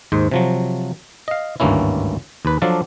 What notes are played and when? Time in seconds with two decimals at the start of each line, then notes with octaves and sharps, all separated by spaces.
0.12 D#2 G#2 C5
0.31 C3 F3 F#3
1.28 D#5 F5
1.60 G#1 D2 G2 A#3 C#4 E4
2.45 D#2 B4
2.62 F3 F#3 D4 A4 D5 F5